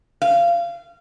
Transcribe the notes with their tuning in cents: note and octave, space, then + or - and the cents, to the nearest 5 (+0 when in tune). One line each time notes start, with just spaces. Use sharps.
F5 -25